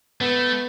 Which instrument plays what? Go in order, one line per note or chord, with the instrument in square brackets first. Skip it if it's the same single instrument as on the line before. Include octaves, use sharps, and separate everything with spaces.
[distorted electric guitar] A3 [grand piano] B3